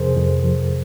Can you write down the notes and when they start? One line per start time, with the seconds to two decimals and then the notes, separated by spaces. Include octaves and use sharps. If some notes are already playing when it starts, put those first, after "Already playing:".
Already playing: F2 C3 F3 G#4 A#4 C5
0.17 F2
0.44 F3